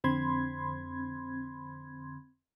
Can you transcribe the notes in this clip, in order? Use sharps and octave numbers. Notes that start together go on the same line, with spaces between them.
F2 D3 C4 B5 C6 G#6